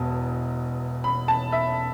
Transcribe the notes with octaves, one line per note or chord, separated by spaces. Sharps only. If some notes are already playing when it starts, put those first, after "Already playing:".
Already playing: E1 E2 B2 A5
B5
A5
E5